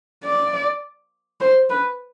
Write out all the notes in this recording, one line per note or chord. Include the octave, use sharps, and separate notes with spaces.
D5
C5
B4